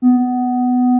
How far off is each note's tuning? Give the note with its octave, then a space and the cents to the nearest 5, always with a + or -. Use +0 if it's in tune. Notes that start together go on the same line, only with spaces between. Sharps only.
B3 +15